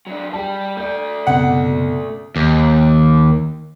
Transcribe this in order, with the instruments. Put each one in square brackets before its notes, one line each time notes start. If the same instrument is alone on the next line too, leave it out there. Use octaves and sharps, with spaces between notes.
[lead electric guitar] F#3 D4
[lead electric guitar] G3 G4 [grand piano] A5
[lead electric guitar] A3 D5 [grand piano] G6
[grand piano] F#1 C2 B2 [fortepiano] F#5
[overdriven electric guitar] D#2